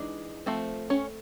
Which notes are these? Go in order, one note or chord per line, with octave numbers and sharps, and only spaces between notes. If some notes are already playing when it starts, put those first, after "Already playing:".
Already playing: E3 G#3 D4 D#4
F3 A3 C4
C#4 C#5